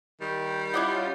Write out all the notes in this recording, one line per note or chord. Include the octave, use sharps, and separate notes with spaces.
D#3 G3
C#4 E4 F4 D5 D#5 F#5